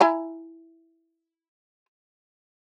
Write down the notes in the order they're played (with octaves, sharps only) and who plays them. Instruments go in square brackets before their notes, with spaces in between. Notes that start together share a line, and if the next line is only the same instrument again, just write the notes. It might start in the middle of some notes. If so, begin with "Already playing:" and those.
[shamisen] E4 G#5 A#5